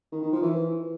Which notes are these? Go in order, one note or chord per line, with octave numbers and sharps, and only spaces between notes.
D#3
D#3
F3
E3